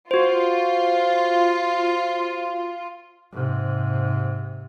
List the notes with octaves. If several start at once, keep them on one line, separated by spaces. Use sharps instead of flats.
F4 F#4 C5
G#2 C3